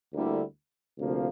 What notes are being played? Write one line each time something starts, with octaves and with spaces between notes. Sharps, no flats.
D2 D3 G3 A#3 E4
D2 C3 F3 A#3